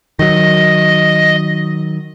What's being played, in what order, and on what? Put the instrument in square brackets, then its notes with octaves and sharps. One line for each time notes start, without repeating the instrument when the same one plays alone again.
[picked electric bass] D#3 F#3 [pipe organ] D#5